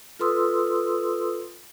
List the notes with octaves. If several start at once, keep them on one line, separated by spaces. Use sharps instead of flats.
F4 A4 B4 C6 D#6 E6